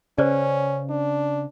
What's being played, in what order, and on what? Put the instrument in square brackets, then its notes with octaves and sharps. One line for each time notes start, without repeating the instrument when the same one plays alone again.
[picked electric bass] C#3 [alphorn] C#4 [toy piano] B4 C5 D5
[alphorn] D4